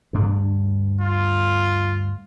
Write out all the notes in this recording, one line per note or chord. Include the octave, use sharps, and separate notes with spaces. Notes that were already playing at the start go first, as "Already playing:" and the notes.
D2 G2 D4
F4